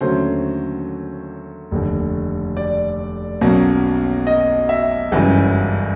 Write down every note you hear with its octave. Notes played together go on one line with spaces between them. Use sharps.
D#2 D3 F#3 A3 C#4 C5
F1 D#2 D3
D5
B1 B2 F#3 A#3 C#4
D#5
E5
G1 F#2 C#3 E3 G#3